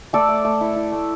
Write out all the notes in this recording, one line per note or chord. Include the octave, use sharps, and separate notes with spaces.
A3 A4 D5
A3
A3
E4
E4
A3